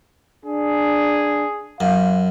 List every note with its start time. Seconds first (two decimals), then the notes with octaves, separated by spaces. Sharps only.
0.46 D4 G#4
1.81 F#2 F5